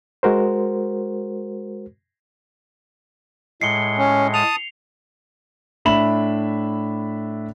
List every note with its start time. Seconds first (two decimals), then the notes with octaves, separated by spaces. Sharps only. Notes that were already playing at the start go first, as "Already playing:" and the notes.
0.23 G#3 F#4 A#4 C5
3.61 A2 G#3 C7 C#7 G7
3.98 C#4
4.34 A5 D#6 F7
5.85 A2 D4 E5 B5 E7 F#7